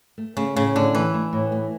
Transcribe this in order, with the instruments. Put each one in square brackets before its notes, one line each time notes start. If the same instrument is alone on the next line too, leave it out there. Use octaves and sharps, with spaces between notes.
[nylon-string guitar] A3
[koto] C#3 [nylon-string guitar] A3
[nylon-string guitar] A2 [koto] C#3
[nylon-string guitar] A2 [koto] D3
[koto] E3 [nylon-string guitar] A3
[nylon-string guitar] A3
A2
A3